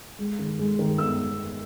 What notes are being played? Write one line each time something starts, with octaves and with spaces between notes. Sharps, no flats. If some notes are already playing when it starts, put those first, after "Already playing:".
G#3
D#3
G#3
D#3
B3 E6